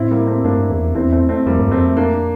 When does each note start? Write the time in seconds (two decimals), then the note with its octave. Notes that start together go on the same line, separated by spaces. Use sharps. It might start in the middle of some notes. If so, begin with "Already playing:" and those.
Already playing: A2 C4 E4
0.11 G3 A#3
0.27 A3 C4
0.44 G2 A#3 D4
0.70 E2
0.95 E2 C4 E4
1.12 A3 C4
1.29 A3 C4
1.46 F2 G3 A#3
1.59 G2
1.71 F2 A3 C4
1.97 A#3 D4